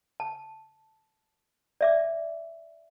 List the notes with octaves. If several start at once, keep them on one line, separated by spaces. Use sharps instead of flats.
A5
D5 E5 D6